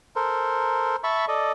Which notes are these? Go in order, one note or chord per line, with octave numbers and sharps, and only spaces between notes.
A4 A#4 C5
E5 A5 B5 C#6
A4 D5 D#5